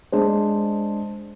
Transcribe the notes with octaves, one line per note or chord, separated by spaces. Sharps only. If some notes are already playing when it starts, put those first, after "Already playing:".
G#3 D4 G#4 C5